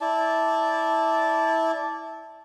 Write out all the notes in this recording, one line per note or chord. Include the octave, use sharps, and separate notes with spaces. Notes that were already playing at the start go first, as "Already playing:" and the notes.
E4 D5 A5